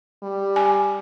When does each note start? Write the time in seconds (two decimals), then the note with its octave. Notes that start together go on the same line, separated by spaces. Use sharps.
0.23 G3
0.56 G#5